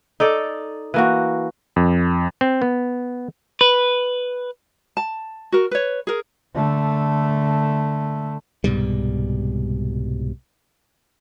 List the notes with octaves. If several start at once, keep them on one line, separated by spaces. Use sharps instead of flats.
D#4 A4 D5
E3 A#3 F#4
F2
C4
B3
B4
A5
F#4 A#4
B4 C#5
G#4 A#4
D3 A3
C2 G#2 B2 G3